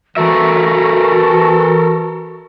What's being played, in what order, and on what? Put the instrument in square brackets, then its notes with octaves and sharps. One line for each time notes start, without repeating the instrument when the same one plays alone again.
[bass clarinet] E3 [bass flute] F#4 [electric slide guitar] A4 A#4 E5